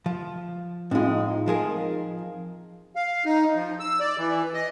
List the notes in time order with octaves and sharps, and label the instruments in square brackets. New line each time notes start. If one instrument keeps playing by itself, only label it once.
[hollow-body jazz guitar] F3
[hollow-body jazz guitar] A2 G#3 [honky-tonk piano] C4 D#4 F4
[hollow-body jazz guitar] F3 G#4 A#4
[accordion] F5
D#4
F3
E6
D5
E3
D#5